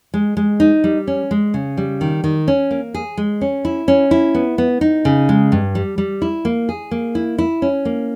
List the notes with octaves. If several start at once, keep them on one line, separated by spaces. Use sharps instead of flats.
G#3
G#3
D#4
G3
C#4
G#3
C#3
G3
D#3
D#3
C#4
A#3
G#4
G#3
C#4
E4
C#4
E4
B3
B3
D#4
C#3
G#3
G2
G3
G3
E4
A#3
G#4
A#3
E4
E4
C#4
A#3